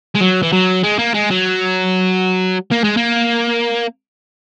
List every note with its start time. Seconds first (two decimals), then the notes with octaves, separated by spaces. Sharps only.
0.15 G#3
0.21 F#3
0.43 E3
0.53 F#3
0.83 G#3
0.98 A#3
1.14 G#3
1.30 F#3
2.71 A#3
2.84 G#3
2.97 A#3